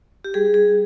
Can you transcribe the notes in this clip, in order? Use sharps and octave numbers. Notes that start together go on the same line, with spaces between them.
G4
G3 G#4
G#4